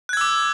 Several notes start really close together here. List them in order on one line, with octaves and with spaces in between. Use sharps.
F#6 G#6 E6 D6